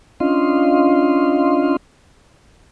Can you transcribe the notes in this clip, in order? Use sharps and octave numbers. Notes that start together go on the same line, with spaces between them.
C#4 D4 F4 D#5 F5 C6